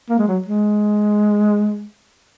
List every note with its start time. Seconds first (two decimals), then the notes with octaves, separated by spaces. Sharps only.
0.10 A#3
0.18 G#3
0.28 F#3
0.46 G#3